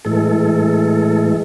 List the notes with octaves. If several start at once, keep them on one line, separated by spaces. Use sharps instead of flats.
A2 E3 G#3 A4